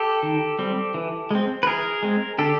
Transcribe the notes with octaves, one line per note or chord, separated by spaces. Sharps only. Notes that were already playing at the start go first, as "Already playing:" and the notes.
Already playing: G4 A4
D#3
G3 C4
E3
G#3 C4
B4
E3 G#4 A#4
G#3 C4
D3 G4 A4